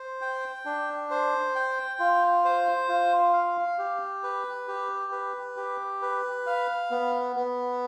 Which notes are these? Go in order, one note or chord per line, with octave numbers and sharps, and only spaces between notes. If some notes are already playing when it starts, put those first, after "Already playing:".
Already playing: C5
G5
D4
C5
G5
F4
C5
F4
F5
G4
B4
G4
B4
G4
B4
F5
B3
B3